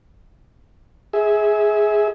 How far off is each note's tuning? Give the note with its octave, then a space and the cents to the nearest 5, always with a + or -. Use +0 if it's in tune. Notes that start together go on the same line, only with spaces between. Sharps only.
G#4 +5 E5 -25